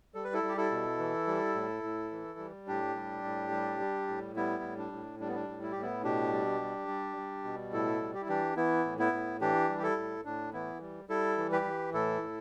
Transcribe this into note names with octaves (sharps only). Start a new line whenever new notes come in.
G3 A4
B4
E4 A4
G3
G4
E4 A4
B2
E3
G3
A2
A2
E3
G3
A2 D4 G4
G3
A2
G3
G3
A2
G3 B3 E4
A2
D4
A2
G3 D4
B3
D4
A2
E4
A2 G4
B3 E4
B2 D4 G4
G3
G3
G3
G3
B2
A2 E4 A4
G3
G4
E4
E3 D4 G4
E3 B3 E4
A2
B3 E4
A2
E3 D4 G4
G3
G4
E4 A4
A2
A2 D4
E3 B3 E4
G3
G3 E4 A4
E3
G4 B4
E3
A2 E4 A4
A2